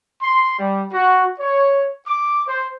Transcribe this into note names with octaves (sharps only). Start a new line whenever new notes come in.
C6
G3
F#4
C#5
D6
C5